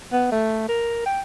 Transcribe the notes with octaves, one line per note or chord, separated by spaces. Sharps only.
B3
A3
A#4
G5